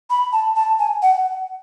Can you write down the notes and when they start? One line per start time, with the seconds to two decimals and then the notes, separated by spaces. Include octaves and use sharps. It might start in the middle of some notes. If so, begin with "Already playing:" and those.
0.10 B5
0.33 A5
0.56 A5
0.79 G#5
1.03 F#5